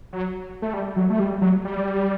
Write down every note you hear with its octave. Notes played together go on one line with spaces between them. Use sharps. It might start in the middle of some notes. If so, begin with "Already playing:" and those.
F#3
A3
G3
F#3
A3
G3
F#3
G3